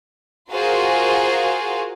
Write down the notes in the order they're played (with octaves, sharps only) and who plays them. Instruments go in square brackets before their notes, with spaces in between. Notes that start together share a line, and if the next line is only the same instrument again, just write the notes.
[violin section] F4 F#4 G#4 A#4 C5 F5